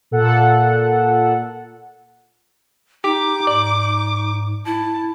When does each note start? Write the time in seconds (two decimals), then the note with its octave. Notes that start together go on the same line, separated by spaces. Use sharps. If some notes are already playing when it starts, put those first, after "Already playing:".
0.11 A#2 A4 F#5
3.04 D#4 G4 D6
3.47 G#2 D5
4.66 E4 A5